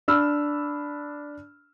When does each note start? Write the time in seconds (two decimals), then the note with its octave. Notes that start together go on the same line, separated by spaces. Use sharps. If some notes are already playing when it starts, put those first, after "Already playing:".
0.08 D4 B5 E6 F6